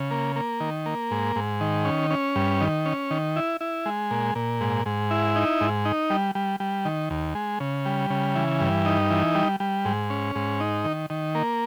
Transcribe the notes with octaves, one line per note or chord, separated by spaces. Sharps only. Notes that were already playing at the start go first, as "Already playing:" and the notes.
Already playing: C#3
A#3
A#3
D#3
A#3
G#2
G#2
D#3
C#4
C#4
G2
D#3
C#4
D#3
E4
E4
G#3
A#2
A#2
G#2
G#2
E4
D#4
G#2
D#4
G3
G3
G3
D#3
D#2
G#3
C#3
G3
C#3
E3
G2
D#4
E3
G3
G3
G#2
C#4
G#2
D#4
D#3
D#3
A#3